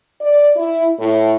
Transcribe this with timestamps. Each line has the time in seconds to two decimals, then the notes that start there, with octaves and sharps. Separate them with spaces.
0.21 D5
0.56 E4
0.99 A2